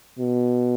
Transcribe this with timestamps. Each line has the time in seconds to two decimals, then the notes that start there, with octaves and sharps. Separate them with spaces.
0.19 B2